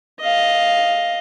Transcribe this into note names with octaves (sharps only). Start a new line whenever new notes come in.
D#5 F5